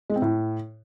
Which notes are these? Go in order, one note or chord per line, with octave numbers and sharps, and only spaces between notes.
G#3
C4
A2